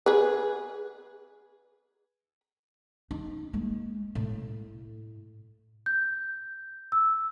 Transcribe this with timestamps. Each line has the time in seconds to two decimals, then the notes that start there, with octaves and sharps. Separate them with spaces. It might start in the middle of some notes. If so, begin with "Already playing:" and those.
0.06 G#4 B4
3.11 D#4
3.53 G#3 A#3
4.15 A2
5.86 G6
6.92 E6